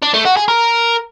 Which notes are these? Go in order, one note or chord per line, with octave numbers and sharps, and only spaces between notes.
D4
A3
F#4
G#4
A#4